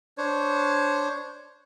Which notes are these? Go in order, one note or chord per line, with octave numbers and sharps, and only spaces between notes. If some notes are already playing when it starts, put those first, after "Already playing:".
D4 C5 C#5